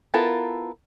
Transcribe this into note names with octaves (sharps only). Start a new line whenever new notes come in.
B3 E4 F4 A4 A#4